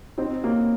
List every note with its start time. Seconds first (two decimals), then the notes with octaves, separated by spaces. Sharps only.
0.18 C4 D#4
0.44 A#3 C#4